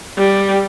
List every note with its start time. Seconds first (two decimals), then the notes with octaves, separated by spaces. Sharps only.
0.17 G3